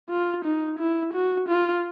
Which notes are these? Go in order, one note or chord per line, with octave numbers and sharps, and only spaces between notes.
F4
D#4
E4
F#4
F4